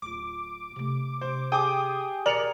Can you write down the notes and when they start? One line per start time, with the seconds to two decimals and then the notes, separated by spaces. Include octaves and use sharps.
0.02 D1 F4 D6
0.76 C3 A3
1.21 C3 D4 C5
1.52 G4 G#4 G5 D6 D#6
2.26 A#2 D#3 A#4 D5 C#7 F7 F#7